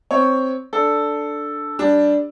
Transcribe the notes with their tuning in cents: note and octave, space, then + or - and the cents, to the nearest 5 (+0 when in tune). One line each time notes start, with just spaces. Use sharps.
C4 +0 C#5 +0
D4 +0 A4 +0
G3 +0 D4 +0